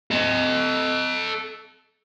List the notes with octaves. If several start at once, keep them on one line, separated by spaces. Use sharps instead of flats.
A4 D#5